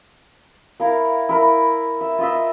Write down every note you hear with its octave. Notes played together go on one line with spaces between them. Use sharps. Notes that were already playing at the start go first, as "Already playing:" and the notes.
E4 A#4 F5
E4 A#4 B5
E5
F4 D#5 E5